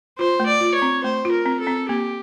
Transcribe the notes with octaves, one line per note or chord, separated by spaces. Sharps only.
F4 C5
A3
D5
F4
C#5
C4
A3 C5
F4
A#4
C4
A4
C4
A#3 G4